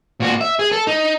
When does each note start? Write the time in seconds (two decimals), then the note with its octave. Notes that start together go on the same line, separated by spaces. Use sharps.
0.20 A#2 F#4
0.41 E5
0.59 G#4
0.72 A4
0.87 D#4